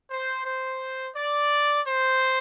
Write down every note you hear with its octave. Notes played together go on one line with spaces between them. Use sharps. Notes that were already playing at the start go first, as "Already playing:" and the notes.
C5
C5
D5
C5